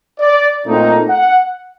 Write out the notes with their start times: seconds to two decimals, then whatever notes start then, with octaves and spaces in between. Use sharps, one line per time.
0.20 D5
0.65 A#2 A3 C4 D#4
1.10 F#5